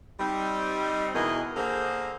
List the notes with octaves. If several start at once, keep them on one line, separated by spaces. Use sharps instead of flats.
G3 C4 D#4
E2 B2 E3 G#4 A#4 D#5
D3 A#3 G#4 A#4 C5